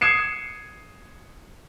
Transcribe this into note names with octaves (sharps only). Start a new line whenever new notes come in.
D#6 G#6 C7 C#7 E7